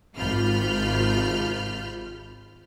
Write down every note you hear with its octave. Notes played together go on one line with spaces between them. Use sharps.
G#1 C3 F4 B5 F6 G6